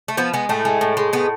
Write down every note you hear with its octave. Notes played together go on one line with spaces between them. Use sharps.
A3
F3 B3
G#3 B3
A2 A3
G#3
A2
G#3
A2 B3